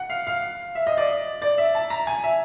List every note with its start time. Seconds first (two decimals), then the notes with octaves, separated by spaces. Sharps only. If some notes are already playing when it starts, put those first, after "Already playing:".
Already playing: F#5
0.10 F5
0.27 F5
0.75 E5
0.87 D#5
0.97 D5
1.42 D5
1.58 E5
1.75 A5
1.90 A#5
2.07 G#5
2.24 E5